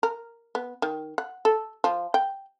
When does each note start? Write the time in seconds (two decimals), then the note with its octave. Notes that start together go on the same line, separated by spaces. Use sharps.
0.03 A#4
0.55 B3
0.82 D#3
1.18 F#5
1.45 A4
1.84 F3
2.14 G5